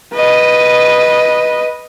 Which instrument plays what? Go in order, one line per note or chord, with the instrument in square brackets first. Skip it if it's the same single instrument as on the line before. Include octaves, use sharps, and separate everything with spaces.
[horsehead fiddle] B4 D#5